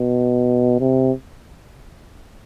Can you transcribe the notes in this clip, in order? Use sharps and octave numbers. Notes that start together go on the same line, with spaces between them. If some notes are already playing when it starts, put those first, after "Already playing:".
Already playing: B2
C3